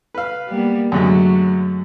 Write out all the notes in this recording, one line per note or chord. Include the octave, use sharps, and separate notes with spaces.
B4 F5
G3 A#3 B3
F#2 D3 F#3 G#3 A3